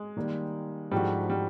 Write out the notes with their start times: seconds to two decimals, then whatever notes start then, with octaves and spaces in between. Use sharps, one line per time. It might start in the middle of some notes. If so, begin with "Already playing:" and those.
Already playing: G#3
0.17 D#3 G3 A#3
0.91 G#2 F3 G3 A3 D4 F#4
1.30 G3